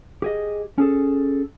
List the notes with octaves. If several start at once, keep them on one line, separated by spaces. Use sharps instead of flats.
G4 G#4 D#5
C#4 G#4 A4